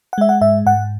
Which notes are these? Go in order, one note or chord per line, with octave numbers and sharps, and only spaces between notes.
F#5
G#3 E5
F#5
G#2 E5
G#2 F#5